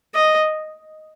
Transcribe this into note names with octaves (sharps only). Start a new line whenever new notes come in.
D#5